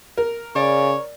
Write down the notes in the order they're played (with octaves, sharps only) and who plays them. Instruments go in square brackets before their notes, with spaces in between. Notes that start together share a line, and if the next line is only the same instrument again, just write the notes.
[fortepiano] A#4
[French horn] C#3 [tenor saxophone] C#5 [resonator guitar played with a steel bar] D5